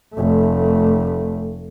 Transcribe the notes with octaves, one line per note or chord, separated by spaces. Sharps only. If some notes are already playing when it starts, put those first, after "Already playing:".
F1 A3